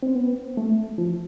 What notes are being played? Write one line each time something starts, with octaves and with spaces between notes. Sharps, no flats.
C4
B3
A3
F3